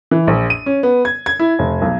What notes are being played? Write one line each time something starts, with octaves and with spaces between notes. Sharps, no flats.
E3
A#1
D#7
C#4
B3
G#6
G#6
E4
F1
B1